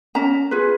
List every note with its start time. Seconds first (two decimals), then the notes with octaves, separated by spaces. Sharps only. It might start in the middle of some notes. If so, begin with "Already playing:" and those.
0.15 C#4 A#5
0.51 F4 G#4 B4